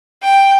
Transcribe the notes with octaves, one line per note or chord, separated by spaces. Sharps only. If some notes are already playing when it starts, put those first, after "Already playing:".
G5